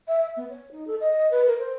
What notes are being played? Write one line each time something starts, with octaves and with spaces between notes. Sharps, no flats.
E5
B3
C#5
D#4
A4
D#5
B4
A#4
C5